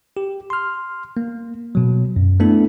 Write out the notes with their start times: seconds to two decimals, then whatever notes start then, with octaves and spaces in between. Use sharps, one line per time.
0.17 G4
0.50 C6 F6
1.17 A#3
1.75 B2 F#3
2.16 F#2
2.40 A3 B3 D4 E4 A4